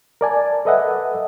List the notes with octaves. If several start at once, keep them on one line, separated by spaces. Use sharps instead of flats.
A#4 D5 G#5 A5
A4 B4 D#5 E5 F#5